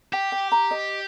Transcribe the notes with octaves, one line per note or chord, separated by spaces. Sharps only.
G4 G5
G5
A#5
D#5